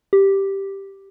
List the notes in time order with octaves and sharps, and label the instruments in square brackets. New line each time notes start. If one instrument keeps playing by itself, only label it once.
[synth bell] G4